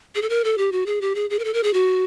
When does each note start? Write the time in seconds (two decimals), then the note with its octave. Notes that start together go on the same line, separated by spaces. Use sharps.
0.15 G#4
0.22 A4
0.30 A#4
0.44 A4
0.58 G4
0.72 F#4
0.86 G#4
1.01 G4
1.15 G#4
1.30 G#4
1.39 A#4
1.44 A4
1.54 A#4
1.63 G#4
1.73 F#4